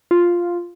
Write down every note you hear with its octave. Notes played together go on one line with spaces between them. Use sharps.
F4